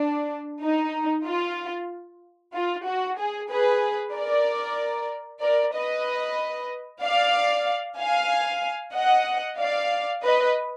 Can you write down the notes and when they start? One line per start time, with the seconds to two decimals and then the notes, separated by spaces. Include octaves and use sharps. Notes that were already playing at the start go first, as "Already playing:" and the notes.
Already playing: D4
0.62 D#4
1.25 F4
2.54 F4
2.86 F#4
3.18 G#4
3.50 G#4 B4
4.14 A#4 D5
5.42 A#4 D5
5.74 B4 D#5
7.02 D5 F5
7.99 F5 G#5
8.94 D#5 F#5
9.59 D5 F5
10.22 B4 D#5